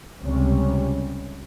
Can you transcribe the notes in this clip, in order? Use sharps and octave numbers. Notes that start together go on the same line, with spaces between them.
C#2 C3 G3 C#4